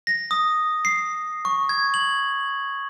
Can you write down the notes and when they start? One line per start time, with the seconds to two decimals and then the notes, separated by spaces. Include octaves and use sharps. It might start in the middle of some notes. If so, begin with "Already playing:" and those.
0.07 A#6
0.31 D#6
0.85 C7
1.45 C#6
1.69 G#6
1.94 F#7